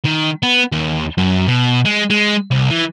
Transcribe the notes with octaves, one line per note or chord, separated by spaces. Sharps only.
D#3
B3
D#2
F#2
B2
G#3
G#3
C2
E3